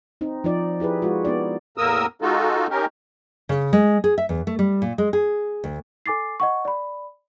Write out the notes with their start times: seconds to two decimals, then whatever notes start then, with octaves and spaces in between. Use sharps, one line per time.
0.21 C4 D#4
0.44 F3 D#4 D5
0.80 E4 G4 G#4 B4
1.02 G#3 F4 F#4
1.25 B3 D#4 D5
1.78 E2 A2 A#3 A#4 D#6 E6
2.22 G#3 D#4 F4 F#4 A4
2.70 C#4 D#4 G4 A#4
3.49 C#3
3.73 G#3
4.04 G#4
4.18 E5
4.29 E2
4.47 A3
4.59 G3
4.82 A#2
4.98 G#3
5.13 G#4
5.64 D2
6.06 A4 G#5 D6 A6 C7
6.40 D#5 F#5 C#6
6.65 D5 B5